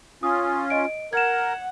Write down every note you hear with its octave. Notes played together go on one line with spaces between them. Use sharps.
C#4 F4 D#6
D#5 D7
A#4 F#5 G#6 E7